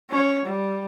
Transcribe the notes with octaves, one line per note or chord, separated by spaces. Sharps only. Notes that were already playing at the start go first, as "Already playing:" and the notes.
C#4 C#5
G3